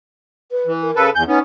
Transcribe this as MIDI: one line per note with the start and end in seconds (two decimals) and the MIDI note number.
0.51 0.72 71
0.66 0.91 52
0.82 1.03 70
0.96 1.10 49
0.96 1.10 69
0.96 1.10 71
1.15 1.24 40
1.15 1.23 80
1.15 1.24 91
1.28 1.39 59
1.28 1.39 61
1.28 1.39 63